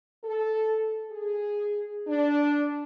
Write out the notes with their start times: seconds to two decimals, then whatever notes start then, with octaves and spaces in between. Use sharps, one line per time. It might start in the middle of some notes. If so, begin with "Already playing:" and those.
0.24 A4
1.10 G#4
2.07 D4